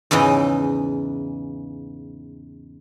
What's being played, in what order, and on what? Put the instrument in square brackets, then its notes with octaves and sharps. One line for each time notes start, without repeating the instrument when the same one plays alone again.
[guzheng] E2 G#2 C#3 E3 D#5